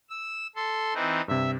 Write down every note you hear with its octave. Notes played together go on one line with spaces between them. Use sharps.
E6
A4 C6
E3 C4 D#4
G2 C3 E5